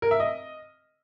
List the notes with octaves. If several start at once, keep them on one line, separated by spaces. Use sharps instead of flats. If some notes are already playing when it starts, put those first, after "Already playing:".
A#4
E5
D#5